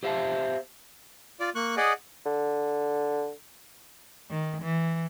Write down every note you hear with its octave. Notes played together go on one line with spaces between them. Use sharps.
G4 C5 E5 F5 G5 A5
F4 D5
A#3 C#6 F#6
G#4 D5 D#5 F#5
D3
D#3
E3